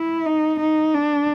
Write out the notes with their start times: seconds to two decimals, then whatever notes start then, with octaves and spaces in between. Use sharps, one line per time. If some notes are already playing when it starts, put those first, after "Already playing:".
Already playing: E4
0.26 D#4
0.60 D#4
0.94 D4